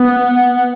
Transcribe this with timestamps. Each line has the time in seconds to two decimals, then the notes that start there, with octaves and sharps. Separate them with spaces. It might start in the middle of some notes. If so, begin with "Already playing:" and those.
Already playing: B3